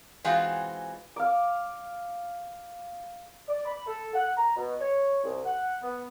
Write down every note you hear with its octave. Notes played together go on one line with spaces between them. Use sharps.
E3 G#3 C4 F4 F#4
F5 D6
D5
B5
A4
F#5
A#5
B2
C#5
C2
F#5
B3